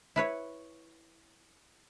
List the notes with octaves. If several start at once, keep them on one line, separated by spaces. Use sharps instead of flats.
E4 B4 C#5